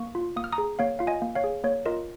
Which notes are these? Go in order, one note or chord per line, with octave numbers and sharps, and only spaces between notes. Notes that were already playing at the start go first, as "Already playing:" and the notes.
Already playing: A#3 C#6
F4
A#3 D#6
F6
A#5 D#6
G#4
A#3 C#5 F5
F4 F5
D#5 G#5
A#3
C#5 F5
G#4
A#3 C#5
F4 A#4 D#5